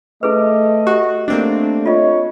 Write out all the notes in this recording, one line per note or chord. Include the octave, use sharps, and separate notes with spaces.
A3 E4 G#4 B4 D#5
F#4 G4
A3 A#3 C4 D4
F4 C#5 D#5